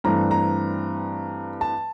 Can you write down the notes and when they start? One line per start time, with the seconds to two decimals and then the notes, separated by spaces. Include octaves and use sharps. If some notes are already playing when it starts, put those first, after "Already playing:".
0.04 G2 E3 A3 C4 A#5
0.31 A#5
1.61 A5